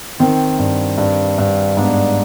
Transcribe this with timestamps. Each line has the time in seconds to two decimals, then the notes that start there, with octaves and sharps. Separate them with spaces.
0.19 D#3 C4
0.58 G2
0.98 G2
1.38 G2
1.76 G#2 B3 D4